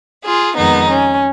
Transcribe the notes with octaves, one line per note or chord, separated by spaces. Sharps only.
F4 G#4
F2 D#3 G#3 B3 D#4
C#4